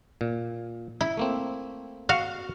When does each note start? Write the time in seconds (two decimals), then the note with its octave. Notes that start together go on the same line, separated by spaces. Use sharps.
0.21 A#2
1.01 E4
1.17 A3 A#3 C4
2.09 F#4 F5